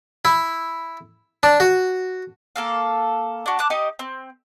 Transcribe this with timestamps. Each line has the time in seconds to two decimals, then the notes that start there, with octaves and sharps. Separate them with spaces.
0.25 E4
1.43 D4
1.60 F#4
2.56 A#3 A4 F5
3.46 D4 F#4
3.59 A5 D6 F#6
3.70 D#4 G4 D#5
3.99 C4